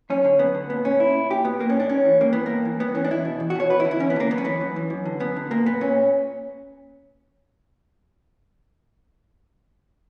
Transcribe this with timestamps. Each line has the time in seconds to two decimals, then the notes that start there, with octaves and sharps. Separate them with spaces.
0.10 F#2 C#4
0.24 D3
0.39 F#2 B3
0.55 D3
0.70 A#2 B3
0.85 C#4
0.99 A#2 E4
1.30 A#2 G4
1.45 B3
1.59 A#2 A#3
1.70 C#4
1.80 D4
1.89 G2 C#4
2.06 E3
2.20 G2 A#3
2.33 E3 B3
2.46 G2 A#3
2.65 E3
2.80 G2 B3
2.95 E3 C#4
3.04 D4
3.11 E2 E4
3.25 B2
3.40 E2
3.50 F#4
3.55 B2 C#5
3.70 E2 B4
3.80 E4
3.85 D3
3.91 E4
4.00 E2 C#4
4.10 B3
4.16 D3 A#3
4.31 F#2 B3
4.38 C#4
4.45 E3 B3
4.61 F#2
4.76 E3
4.90 F#2
5.05 D3
5.20 F#2 B3
5.36 D3
5.51 A#2 A#3
5.66 B3
5.81 A#2 C#4